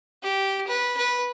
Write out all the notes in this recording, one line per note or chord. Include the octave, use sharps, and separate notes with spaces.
G4
B4
B4